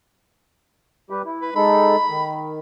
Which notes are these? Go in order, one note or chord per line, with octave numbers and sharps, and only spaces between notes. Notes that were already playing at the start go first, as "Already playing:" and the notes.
G3 G4 B4
E4
B4
G#3 D#4 A4 B5
D#3